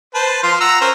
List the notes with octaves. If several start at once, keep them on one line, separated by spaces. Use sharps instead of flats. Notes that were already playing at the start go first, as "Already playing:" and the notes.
B4 C5 A5
F3 F4 C6
F#5 A#5 E6
C#4 A#4 C5